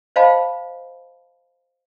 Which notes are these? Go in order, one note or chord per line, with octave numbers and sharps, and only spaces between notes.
C5 D#5 F5 G5 A5 B5